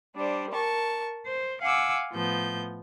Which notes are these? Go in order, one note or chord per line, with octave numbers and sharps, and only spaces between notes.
G3 D4 C5
A#4 A5 C#6
C5
F5 F#5 G#5 D6 E6
A2 F3 B3 G6